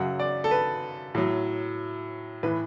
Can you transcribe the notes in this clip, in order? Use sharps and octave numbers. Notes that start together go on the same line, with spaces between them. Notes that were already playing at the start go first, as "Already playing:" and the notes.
Already playing: F#2 C#3 F#3 F#5
D5
A4
B4
A2 F#3
A2 E3 B4